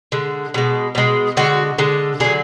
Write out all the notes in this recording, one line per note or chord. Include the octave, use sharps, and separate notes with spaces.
D3 G#3
B2 G#3
B2 G#3
D3 G#3 F#4
D3 G#3
D3 F#3 G#4